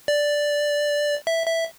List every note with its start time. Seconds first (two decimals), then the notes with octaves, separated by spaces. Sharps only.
0.08 D5
1.27 E5
1.47 E5